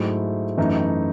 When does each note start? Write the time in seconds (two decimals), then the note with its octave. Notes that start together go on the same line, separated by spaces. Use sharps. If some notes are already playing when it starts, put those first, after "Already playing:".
Already playing: G#2 F#3 A3 E4
0.57 F#2 E3 A3 D#4